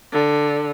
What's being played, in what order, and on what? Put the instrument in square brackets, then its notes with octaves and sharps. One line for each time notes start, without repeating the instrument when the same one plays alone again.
[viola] D3